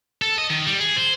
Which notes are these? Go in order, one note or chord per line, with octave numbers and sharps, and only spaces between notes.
A4
D#5
D#3
G3
G#4
C5